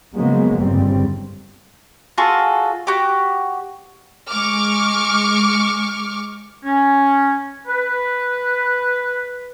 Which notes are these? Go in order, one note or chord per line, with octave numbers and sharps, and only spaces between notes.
C#3 F3 F#3 G#3 A#3 B3
G1 F#2 C#3 G3 C4
F4 F#4 G#4 A4
F#4 G4
G#3 C#6 D6 F6
C#4
B4